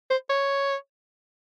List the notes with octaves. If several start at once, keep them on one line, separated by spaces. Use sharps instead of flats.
C5
C#5